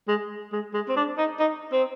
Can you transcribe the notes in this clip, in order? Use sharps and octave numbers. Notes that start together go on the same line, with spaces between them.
G#3
G#3
G#3
C4
D4
D#4
D#4
C4